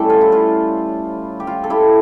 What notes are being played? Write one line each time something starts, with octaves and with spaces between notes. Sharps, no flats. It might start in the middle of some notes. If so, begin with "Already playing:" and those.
Already playing: A2 G3 C#4 G4 A4
F4
E4
F4
G4
F4
A4
E4 G4